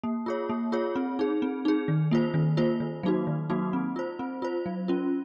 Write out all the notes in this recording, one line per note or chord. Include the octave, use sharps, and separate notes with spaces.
A#3
F4 G#4 C#5
A#3
F4 G#4 C#5
C4
D#4 G#4
C4
D#4 G#4
D#3
A#3 F4 C5
D#3
A#3 F4 C5
D#3
F#3 A#3 D#4 F#4
D#3
F#3 A#3 D#4 F#4
C4
F4 C5
C4
F4 C5
F#3
C#4 F4